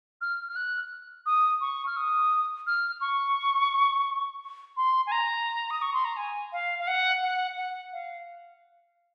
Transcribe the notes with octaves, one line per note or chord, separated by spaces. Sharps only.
F6
F6
F#6
D#6
C#6
F6
D#6
F6
C#6
C6
G#5
A#5
D#6
C#6
C6
A#5
G#5
F5
F5
F#5
F#5
F#5
F5